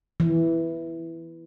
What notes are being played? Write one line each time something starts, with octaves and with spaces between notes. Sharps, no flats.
E3